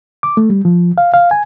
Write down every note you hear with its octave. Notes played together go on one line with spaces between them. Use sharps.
D6
A3
G3
F3
F5
F5
G#5